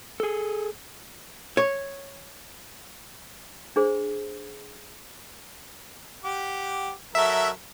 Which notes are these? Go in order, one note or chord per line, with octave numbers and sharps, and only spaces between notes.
G#4 A4
C#5
D4 G#4 C5
G4 F#5 D6
F#3 A4 A#4 E5